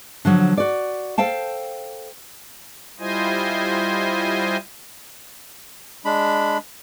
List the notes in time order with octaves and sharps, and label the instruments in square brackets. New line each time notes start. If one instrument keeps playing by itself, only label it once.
[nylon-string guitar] D3 F3 F#3
F#4 D5
A4 C5 F5 G5 A5
[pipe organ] G3 E4 F4 C5 D#5 G#5
[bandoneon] G#3 D4 B5